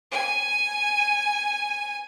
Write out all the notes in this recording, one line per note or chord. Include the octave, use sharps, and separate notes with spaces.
G#5 D#7